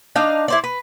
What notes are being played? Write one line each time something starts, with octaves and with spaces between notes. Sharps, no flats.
D4 D#4 D#5 F5
E4 C5 D5
B4